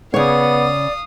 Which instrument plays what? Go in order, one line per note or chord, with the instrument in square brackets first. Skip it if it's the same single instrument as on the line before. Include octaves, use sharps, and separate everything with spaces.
[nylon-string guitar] C#3 C#5 [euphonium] B3 [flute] D5 [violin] F5 D#6